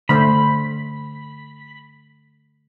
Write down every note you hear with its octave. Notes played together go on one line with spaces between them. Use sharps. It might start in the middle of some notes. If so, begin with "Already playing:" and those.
D3 A3 C5 B5